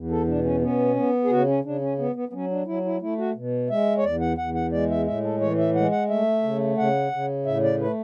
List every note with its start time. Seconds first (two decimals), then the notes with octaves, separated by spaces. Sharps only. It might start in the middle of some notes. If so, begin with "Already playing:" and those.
Already playing: E2
0.11 A4
0.27 B2 D4
0.44 C#4
0.62 B3 C#4
0.96 B3
1.24 G#4
1.30 C#3 F#4
1.47 C#4
1.64 C#3 D4
1.81 C#4
1.99 B3
2.15 B3
2.29 B3
2.33 F#3 C#4
2.50 D4
2.66 F#3 E4
2.85 E4
3.01 A3 E4
3.18 F#4
3.35 B2
3.70 G#3 E5
3.98 C#5
4.04 E2 D5
4.21 F#5
4.38 E2 F#5
4.55 F#5
4.72 G#3 D5
4.90 E5
5.07 A2 E5
5.24 A4
5.41 E3 C#5
5.58 E5
5.75 G#3 F#5
5.92 F#5
6.09 A3 E5
6.43 C#3
6.77 C#3 F#5
7.12 C#3
7.46 A2 E5
7.63 D5
7.80 A3 B4